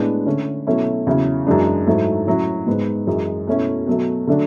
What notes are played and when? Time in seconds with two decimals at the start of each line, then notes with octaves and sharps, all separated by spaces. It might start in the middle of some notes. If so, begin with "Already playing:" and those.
Already playing: A2 G#3 B3 D4
0.26 D3 A3 C#4 E4
0.67 B2 F#3 A3 C#4 E4
1.07 E2 C#3 F#3 C#4 E4
1.47 F#2 E3 G#3 D4
1.87 G#2 F#3 A3 E4
2.27 A2 F#3 C#4 E4
2.67 G#2 G#3 B3
3.07 F#2 E3 G#3
3.47 B2 A3 C#4 E4
3.87 B2 F#3 A3
4.27 D3 F#3 A3 D4